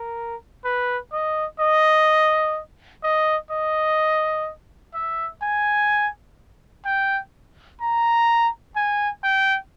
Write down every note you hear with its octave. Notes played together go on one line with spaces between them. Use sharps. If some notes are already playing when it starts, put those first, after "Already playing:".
Already playing: A#4
B4
D#5
D#5
D#5
D#5
E5
G#5
G5
A#5
G#5
G5